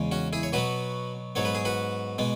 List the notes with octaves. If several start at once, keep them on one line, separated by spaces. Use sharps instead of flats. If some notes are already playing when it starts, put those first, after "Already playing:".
Already playing: E2 C#3 G#3
C#4 F#4
E4 G#4
C#5
B2 F#3 B3 F#4 B4
G#2 F#3 B3 C#5
B4
G#4
F#4 B4
B2 G#3 B3